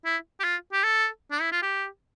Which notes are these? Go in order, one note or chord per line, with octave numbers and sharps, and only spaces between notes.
E4
G4
F4
G4
A4
D4
E4
F4
G4